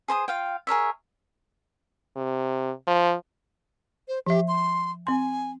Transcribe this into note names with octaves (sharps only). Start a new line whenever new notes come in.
G#4 C5 A#5 D#6
F4 F5 G5
G#4 A#4 C#5 E5
C3
F3
C5
F3 G4 E5
C6
C4 G#5 C6